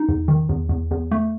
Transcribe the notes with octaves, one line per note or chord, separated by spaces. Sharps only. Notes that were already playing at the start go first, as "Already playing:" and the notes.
Already playing: D#4
E2
D#3
E2
E2
E2
A3